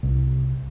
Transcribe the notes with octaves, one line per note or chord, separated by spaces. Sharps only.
C2